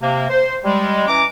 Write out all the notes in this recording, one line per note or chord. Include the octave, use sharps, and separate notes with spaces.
C3 A#3
C5
G3 G#3
E3 C#4 A#5 D6